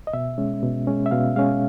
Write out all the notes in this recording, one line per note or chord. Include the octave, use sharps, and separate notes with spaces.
D#5
B2 E5
G#3 C#4
B2
G#3 C#4
E5
B2 F5
G#3 C#4 F5